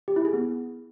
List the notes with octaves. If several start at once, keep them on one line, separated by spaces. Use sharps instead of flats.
G4
E4
G#4
B3